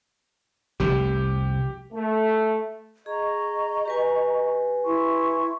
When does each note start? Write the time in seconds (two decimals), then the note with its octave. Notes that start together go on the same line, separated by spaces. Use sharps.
0.80 F1 C2 F3 G4
1.93 A3
3.06 G#4 D#5 A#5 C#6
3.86 G4 B4 G#5
4.85 E4 C6 C#6